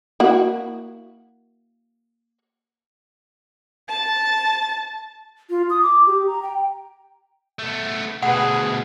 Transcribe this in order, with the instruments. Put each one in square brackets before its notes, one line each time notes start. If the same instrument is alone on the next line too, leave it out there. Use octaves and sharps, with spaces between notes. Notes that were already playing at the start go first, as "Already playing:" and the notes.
[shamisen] A#3 E4 F#4
[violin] A5 A6
[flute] F4
D#6
D6
G4
A#5
G5
[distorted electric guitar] A3 B3
[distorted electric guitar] D2 B2 [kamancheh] G#4 B4 [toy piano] F#5